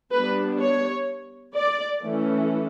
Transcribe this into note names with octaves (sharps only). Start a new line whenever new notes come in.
G3 B3 D4 B4
C#5
D5
E3 A3 C#4